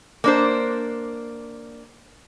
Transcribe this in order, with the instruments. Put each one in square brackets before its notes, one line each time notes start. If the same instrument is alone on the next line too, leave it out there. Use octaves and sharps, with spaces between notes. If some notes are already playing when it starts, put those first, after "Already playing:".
[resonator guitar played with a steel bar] A#3 D4 C5